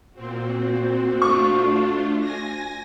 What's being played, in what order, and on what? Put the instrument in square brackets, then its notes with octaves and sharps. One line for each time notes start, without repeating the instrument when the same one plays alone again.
[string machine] A#2 C4 [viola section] F#4 C5
[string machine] A3 D4 F4 [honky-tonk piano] C#6
[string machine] G#5 A#6